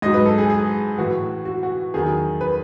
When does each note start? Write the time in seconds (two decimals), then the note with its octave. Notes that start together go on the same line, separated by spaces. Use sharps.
0.02 G#2 F#3 D#5
0.14 B4
0.26 A4
0.38 G#4
0.50 G#4
0.98 A2 E3 F#4
1.45 F#4
1.63 F#4
1.94 E2 D#3 F#3 G#4
2.41 B4